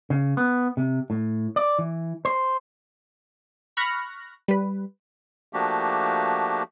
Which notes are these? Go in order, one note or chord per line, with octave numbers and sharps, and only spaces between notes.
C#3
B3
C3
A2
D5
E3
C5
B5 C#6 F6 F#6 A#6
G3 B4
F3 A3 A#3 D4 F#4 G4